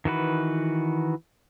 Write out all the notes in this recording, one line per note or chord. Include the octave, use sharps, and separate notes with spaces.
D#3 E3 F#4 B4